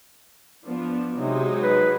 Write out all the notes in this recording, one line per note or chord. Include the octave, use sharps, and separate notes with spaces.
F3 B3 D4
C3 F#3 G#3 D#4
B4